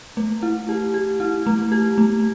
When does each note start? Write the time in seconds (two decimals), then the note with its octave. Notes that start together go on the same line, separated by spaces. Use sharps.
0.17 A3
0.43 E4
0.69 G4
0.94 G4
1.20 E4
1.47 A3
1.72 G4
1.98 A3